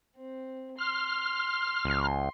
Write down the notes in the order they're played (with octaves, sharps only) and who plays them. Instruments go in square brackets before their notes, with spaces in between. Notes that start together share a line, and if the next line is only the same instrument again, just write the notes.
[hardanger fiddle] C4
[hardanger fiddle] C6 [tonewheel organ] F6
[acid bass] C#2